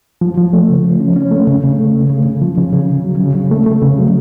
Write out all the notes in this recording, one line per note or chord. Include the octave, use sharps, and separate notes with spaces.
F3
F3
A3
C#3
F3
C#4
C#4
A3
C#3
C#3
A3
C#3
C#3
C#3
F3
C#3
C#3
C#3
F#3
C#3
C#3
A3
A3
C#3
F#3